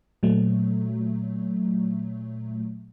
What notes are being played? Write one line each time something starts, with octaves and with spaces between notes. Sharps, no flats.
A#2 F#3 A3